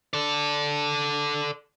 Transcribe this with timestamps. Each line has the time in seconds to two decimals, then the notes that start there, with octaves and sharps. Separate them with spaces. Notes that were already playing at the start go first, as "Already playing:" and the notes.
0.13 A4 D5